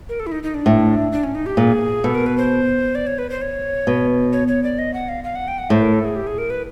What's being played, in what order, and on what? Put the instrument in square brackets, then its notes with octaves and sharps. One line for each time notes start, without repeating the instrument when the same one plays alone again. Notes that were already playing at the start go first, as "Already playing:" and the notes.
[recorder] A#4
A4
E4
D#4
D#4
D4
[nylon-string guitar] A2
[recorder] D4
C#4
D#4
G4
[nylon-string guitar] A#2 [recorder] G#4
[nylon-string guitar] B2 [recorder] A4
[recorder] A#4
B4
C5
D5
C#5
B4
C5
C#5
[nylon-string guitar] B2
[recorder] C#5
C#5
D5
D#5
F#5
F5
F5
F#5
G5
F#5
[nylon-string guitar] A2 [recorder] C5
[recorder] A#4
A4
G#4
G4
G#4
A#4
B4